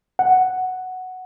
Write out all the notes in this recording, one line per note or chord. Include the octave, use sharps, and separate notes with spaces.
F#5